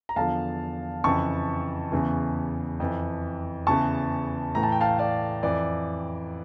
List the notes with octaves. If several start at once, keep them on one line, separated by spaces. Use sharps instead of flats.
A#5
E2 D3 F3 F5 A5
F2 C#3 E3 A5 C#6
E2 C#3 E3
F2 E3
E2 C#3 E3 A5 C#6
A2 E3 A#5
A5
G5
F5 A5
D5 F5
F2 E3 D5